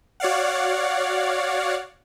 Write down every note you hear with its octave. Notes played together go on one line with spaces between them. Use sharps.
F#4 C#5 D5 F5 F#5